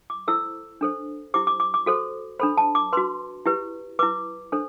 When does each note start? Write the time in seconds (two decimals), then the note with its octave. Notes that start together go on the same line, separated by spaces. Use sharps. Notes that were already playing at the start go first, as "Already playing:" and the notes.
0.10 D6
0.28 E4 A4 C5 E6
0.81 D4 A4 C5
1.34 E4 G4 C5 D6
1.47 D6
1.60 D6
1.74 D6
1.86 F#4 A4 C5
2.39 D4 A4 C5 B5
2.57 A5
2.75 D6
2.93 F#4 B4 C6
3.46 E4 G4 B4
3.99 E4 B4 D6
4.52 D4 A4 C5